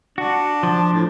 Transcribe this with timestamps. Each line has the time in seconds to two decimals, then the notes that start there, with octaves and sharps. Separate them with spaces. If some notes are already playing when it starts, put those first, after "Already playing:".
0.18 D4 F#4
0.63 F3
0.93 A2